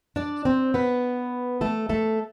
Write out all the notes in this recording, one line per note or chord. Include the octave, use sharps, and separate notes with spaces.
D4 D5
C4 C5
B3 B4
A3 A4
A3 A4